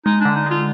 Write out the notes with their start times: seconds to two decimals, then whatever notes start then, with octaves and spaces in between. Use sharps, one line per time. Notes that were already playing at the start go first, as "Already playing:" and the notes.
0.06 G#3 D#4
0.20 D4
0.25 D3
0.36 D#4
0.46 G#3 F4